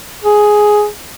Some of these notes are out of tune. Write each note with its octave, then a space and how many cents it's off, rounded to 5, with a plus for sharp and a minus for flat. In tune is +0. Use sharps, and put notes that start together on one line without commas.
G#4 +5